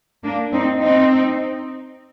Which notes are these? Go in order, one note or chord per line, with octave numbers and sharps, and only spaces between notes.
A#3 D4
C4 D#4
C4 D#4